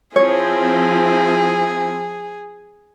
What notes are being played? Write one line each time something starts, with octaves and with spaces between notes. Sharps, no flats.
F3 C4 E4 G#4 C#5